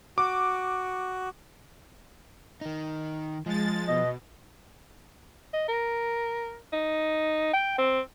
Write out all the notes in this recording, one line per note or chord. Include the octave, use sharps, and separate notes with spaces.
F#4 D6
D#3 D#4
F3 G#3 A6
B2 D#5
D#5
A#4
D#4
G5
C4